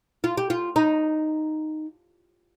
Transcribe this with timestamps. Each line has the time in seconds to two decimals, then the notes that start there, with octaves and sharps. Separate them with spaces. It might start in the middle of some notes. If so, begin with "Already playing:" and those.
0.24 F4
0.37 G4
0.50 F4
0.76 D#4